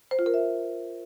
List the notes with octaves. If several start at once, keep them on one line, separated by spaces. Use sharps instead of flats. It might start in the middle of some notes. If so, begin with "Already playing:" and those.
C5
F4
A#4
E5